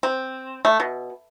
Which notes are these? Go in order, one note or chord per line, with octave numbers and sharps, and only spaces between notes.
C4
A3
B2